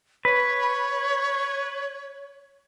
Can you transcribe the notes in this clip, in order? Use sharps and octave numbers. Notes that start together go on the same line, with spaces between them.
B4 C#5